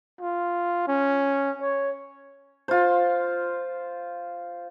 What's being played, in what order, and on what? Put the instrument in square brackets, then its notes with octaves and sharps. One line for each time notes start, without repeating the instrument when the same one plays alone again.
[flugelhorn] F4
C#4
C#5
[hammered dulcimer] F4 C5